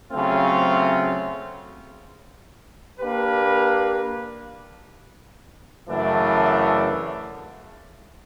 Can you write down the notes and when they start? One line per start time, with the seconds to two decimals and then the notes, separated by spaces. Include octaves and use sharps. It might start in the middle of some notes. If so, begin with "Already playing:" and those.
0.12 C#3 F#3 A3 C4 F4
3.00 A#3 D4 G4 B4
5.88 F#2 C#3 E3 A3 D4